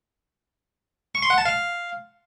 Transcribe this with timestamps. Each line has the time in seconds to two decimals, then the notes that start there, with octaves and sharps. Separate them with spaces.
1.15 C#6
1.23 C6
1.30 F#5
1.38 A5
1.46 F5